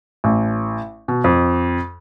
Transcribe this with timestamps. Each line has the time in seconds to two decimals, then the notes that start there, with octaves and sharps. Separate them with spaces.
0.24 A1
1.08 B2
1.24 F2